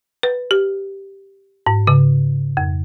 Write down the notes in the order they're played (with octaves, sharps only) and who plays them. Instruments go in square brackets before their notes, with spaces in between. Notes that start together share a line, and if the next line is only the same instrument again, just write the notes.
[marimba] B4
G4
G#2
C#3
F2